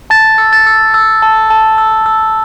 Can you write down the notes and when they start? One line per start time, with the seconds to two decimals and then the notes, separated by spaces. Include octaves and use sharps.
0.10 A5 A6
0.38 E6
0.53 A6
0.67 E6
0.94 E6
1.22 A5
1.50 A5
1.78 E6
2.06 E6